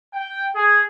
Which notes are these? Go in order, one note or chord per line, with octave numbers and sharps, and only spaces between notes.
G5
G#4